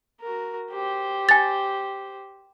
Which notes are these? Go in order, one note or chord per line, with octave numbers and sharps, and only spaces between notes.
F#4 A#4
G4 C5
G#5 A6